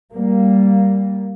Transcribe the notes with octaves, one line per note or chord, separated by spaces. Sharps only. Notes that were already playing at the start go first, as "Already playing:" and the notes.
G3 A#3